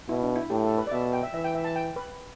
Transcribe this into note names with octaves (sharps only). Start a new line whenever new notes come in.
B2 E4
D4
E4
A2 G4
A4
B4
D5
B2 E5
G5
E5
E3 E5
G5
E5
A5
G5
B4